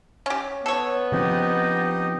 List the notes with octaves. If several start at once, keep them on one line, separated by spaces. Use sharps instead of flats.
C#4 G4
B3 A4 C#5
C#3 F3 C4 D#4 G4 D#5